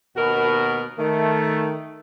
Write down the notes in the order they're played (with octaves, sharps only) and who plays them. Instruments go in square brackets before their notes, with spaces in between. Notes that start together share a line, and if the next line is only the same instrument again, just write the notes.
[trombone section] D#2 B2 [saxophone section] F#4 A#4
[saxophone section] D#3 [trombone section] A3